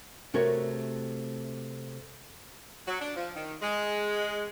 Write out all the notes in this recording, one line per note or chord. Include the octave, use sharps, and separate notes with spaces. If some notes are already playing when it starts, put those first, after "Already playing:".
C3 A3 F#4 A#4 C#5
F#3
D4
F3
D#3
G#3